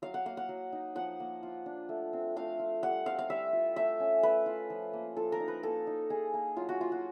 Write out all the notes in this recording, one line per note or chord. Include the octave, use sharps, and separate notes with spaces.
F#3 F5
F#5
A#3 F5
F#5
F#3
D#4
F3 F#5
A#3
F4
D4
A3
C4
A3 F5
F4
G3 F#5
C4 F5
F5
G3 E5
F4
A3 E5
C#4
A3 B4
F4
F3
A#3
F3 A4
A#4
D#4
B4
A#3 A4
D#4
D#4 G#4
A#3
F#3 F4
F#4
A#3 F4
F#4